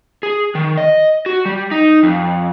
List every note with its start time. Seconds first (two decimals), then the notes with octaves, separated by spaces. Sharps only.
0.23 G#4
0.55 D#3
0.77 D#5
1.26 F#4
1.45 G3
1.71 D#4
2.03 F2